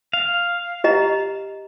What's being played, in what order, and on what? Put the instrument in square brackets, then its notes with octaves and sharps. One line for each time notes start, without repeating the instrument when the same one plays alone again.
[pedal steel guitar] F5
[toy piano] G4 D#5 A#5